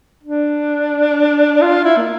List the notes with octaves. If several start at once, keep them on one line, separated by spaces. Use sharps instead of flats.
D4
F4
E4
A#3